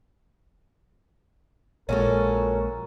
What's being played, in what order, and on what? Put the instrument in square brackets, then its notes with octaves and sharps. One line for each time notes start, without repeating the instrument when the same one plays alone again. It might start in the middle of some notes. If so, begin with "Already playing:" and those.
[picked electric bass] A#1 A#2 G#3 [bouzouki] C#4 F#4 A4 [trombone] A#4